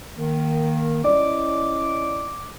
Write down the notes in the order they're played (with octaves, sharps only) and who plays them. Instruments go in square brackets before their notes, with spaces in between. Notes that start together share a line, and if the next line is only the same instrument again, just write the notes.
[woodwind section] D#3 [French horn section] A#3
[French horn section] C#4 E4 D#5 [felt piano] D5 [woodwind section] D6